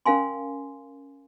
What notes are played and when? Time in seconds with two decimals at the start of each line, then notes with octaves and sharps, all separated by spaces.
0.06 C#4 A#4 F5 G#5 C6